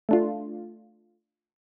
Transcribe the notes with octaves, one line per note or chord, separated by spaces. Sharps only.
A3 D4 F4